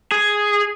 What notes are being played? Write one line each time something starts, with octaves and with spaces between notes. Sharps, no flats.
G#4